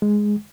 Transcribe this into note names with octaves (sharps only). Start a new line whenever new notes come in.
G#3